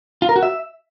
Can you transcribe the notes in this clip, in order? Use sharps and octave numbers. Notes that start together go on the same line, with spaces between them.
F4
A#4
F#4
E5